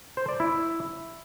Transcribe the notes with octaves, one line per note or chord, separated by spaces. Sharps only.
C5
D5
E4